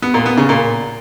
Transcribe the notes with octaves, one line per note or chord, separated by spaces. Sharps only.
B3
A#2
B3
C#3
A#2